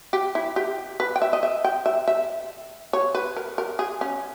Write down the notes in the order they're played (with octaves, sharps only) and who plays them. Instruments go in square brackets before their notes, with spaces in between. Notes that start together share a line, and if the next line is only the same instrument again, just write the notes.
[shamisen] G4
E4
G4
B4
G5
E5
D#5
E5
G5
E5
E5
C#5
B4
A#4
A#4
G#4
C#4